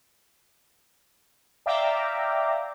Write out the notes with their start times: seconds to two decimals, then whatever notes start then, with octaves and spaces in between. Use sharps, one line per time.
1.66 D5 E5 F5 G5 A#5 D6